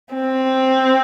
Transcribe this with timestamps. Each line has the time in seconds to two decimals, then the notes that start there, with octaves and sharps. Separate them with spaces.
0.14 C4